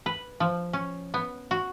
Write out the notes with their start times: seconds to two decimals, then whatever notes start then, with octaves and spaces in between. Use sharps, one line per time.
0.06 B4
0.40 F3
0.73 C#4
1.14 B3
1.51 F#4